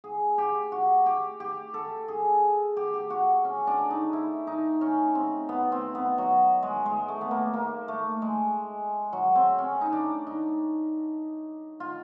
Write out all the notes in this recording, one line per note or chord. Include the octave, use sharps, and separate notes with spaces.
G#4
G4
F#4
G4
G4
A4
G#4
G4
G4
F#4
C#4
D4
D#4
E4
D#4
C#4
C4
B3
C4
B3
F#3
G#3
G#3
A3
B3
A#3
A#3
A3
G#3
F#3
C4
C#4
D#4
D4
D#4
F4